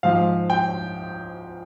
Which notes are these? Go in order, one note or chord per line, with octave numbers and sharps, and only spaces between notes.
G#2 F3 F5
G5